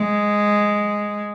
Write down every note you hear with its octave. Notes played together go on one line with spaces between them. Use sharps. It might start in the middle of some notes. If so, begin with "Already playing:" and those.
Already playing: G#3